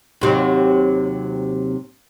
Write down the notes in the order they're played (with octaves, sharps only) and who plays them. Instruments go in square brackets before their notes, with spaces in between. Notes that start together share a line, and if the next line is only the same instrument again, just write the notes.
[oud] D#2 C3 F#3